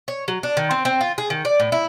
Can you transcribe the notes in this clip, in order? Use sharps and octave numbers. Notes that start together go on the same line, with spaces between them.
C#5
F#3
D4
D#3
C4
C4
F4
G#4
D#3
D5
A2
E4